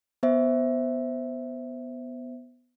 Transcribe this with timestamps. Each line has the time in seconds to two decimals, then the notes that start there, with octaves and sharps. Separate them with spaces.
0.23 B3 C5 E5